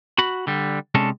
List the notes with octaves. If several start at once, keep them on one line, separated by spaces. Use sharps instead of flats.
F#4 B5
D3 G3
C3 G#3 C#4 D4 A4